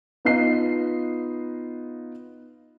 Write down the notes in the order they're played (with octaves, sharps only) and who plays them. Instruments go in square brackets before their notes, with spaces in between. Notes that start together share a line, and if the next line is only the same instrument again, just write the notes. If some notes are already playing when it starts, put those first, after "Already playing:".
[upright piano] B3 D#4 F4 D#5 C7